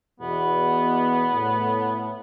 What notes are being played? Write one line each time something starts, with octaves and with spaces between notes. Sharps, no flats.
E2 B2 B3
A2